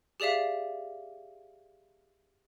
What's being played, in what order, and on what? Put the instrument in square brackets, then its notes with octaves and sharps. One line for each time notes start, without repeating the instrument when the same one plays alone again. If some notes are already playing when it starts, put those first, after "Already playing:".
[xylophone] G4 G#4 D5 E5 F5